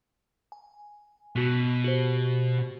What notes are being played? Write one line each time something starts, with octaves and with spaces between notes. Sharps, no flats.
G#5
B2 B3 F#4
F#4 G4 C5